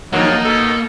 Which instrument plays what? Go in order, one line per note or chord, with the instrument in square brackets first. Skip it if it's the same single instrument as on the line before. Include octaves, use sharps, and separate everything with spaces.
[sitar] G2 D#3 F3 [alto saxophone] F#3 [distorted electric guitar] A#3 [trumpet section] D#4
[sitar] B2 [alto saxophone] A4